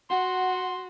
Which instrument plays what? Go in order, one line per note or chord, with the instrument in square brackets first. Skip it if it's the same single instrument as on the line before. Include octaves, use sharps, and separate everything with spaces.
[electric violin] F#4 [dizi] F#5 [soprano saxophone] C6